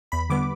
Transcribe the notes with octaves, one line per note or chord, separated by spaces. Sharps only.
E2 B5
D3 G3 B3 D6